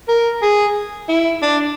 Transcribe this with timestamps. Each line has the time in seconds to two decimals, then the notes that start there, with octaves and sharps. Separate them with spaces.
0.08 A#4
0.42 G#4
1.09 E4
1.42 D4